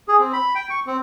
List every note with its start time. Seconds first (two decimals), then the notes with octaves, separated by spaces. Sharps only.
0.08 G#4
0.19 C4
0.33 B5
0.55 G5
0.70 C#6
0.87 C4